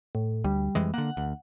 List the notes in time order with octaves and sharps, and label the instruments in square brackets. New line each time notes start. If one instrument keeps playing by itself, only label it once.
[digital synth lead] A2
[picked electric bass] D2 [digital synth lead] G3
[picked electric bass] F2 E3 G#3
[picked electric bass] D3 A#3 [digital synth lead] F#5
[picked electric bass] D2